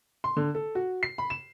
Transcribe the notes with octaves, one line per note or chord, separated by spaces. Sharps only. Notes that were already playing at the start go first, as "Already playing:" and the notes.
C6
D3
A4
F#4
C7
B5
E7